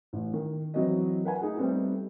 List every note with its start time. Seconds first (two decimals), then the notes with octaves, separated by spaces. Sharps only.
0.13 A1
0.34 D#3
0.74 E3 F#3 C4 F#4 D#5
1.24 A#4 B4 F#5 G#5
1.42 A3 D#4 G#4
1.57 G3 A3 B3 C4 D#4